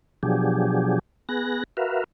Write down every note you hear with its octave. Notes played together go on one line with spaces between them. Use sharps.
B2 F3 F#3 D4 G4 G#4
B3 G#4 F#6 A#6
F#4 A#4 B4 E5 F5